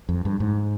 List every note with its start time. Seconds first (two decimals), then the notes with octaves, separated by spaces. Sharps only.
0.09 F2
0.25 G2
0.40 G#2